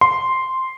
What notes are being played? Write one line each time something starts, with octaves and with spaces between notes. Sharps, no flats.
C6